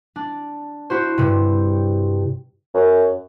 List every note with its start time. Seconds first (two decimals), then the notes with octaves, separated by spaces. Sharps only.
0.16 D4
0.90 E4 F#4 C5
1.18 G2 C3
2.74 F#2